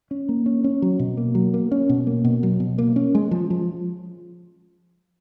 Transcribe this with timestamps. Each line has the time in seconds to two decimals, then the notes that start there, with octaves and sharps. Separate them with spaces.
0.11 C#4
0.29 A#3
0.46 C#4
0.64 C#4
0.82 F#3
0.99 B2
1.17 A#3
1.35 F#3
1.54 A#3
1.72 C#4
1.89 B2
2.07 A#3
2.25 B2
2.43 F#3
2.60 B2
2.78 A#3
2.96 C#4
3.15 G#3
3.31 F3
3.50 F3